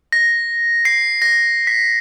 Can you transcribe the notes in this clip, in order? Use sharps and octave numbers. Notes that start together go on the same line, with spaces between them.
A#6
C7
A#6
B6